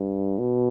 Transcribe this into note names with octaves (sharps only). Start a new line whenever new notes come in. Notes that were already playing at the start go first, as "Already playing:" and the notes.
Already playing: G2
B2